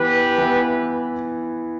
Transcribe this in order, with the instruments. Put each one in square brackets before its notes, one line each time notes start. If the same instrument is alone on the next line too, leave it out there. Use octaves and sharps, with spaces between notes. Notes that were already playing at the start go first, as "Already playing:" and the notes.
Already playing: [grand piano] E3 B3 E4 [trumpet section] G4 B4
[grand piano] E3 B3 E4